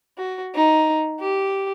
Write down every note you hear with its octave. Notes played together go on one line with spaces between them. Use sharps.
F#4
D#4
G4